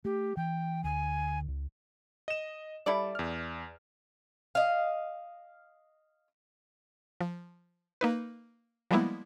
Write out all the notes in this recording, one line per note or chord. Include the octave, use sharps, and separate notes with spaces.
A3 G4
E3 G5
D2 G#5
C#2
D#5 E7
G3 E4 A4 D5
E2 F6
D#5 F5
F3
A#3 D#4 B4
F3 G3 G#3 A#3 B3 E4